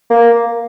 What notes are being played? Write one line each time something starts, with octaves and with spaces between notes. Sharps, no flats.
A#3